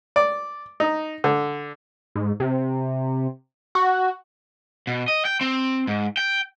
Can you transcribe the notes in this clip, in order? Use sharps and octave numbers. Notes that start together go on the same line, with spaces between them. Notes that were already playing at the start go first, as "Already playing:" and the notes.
D5
D#4
D3
G#2
C3
F#4
B2
D#5
G5
C4
G#2
G5